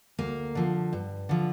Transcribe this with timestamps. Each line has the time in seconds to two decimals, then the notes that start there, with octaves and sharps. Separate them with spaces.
0.19 D2 A#3
0.55 D3 F3
0.93 G2
1.29 D3 F3